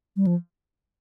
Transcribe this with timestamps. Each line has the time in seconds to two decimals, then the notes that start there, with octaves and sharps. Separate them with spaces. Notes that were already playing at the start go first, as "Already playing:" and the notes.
0.16 G3
0.27 F3